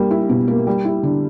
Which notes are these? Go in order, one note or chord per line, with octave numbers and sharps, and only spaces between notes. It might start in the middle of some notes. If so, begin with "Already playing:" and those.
Already playing: G3 A#3
E4
B2
A#3
G3
E4
D3